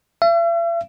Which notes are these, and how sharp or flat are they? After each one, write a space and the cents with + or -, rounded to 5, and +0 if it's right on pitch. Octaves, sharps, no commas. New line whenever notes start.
E5 +45